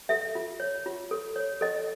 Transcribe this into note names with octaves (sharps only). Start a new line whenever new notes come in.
A4 E5
F4
C#5
F4
A4
C#5
A4 D#5